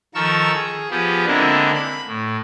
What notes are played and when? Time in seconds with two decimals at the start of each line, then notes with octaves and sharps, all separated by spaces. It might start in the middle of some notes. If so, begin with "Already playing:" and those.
0.15 D#3 F3 A4 A#4 C#6 E6
0.54 G#4
0.90 F3 B3 G4 G#4
1.27 D3 G#3 A#3 C4 D4 E4
1.74 B5
2.07 A2